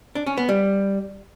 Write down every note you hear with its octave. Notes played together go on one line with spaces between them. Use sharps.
D4
C#4
B3
G3